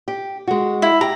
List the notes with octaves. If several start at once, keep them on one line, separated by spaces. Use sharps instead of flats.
G4
G#3 F#4
E4
G4 A#5